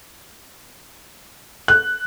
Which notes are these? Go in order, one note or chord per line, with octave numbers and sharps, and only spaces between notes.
F#6